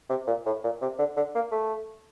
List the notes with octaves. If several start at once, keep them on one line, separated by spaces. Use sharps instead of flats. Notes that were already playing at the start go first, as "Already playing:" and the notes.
C3
A#2
A2
A#2
C3
D3
D3
A#3
A3